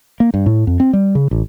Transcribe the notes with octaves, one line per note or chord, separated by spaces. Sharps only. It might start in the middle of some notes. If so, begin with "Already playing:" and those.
A#3
G2
A2
F2
C4
G3
C#3
A1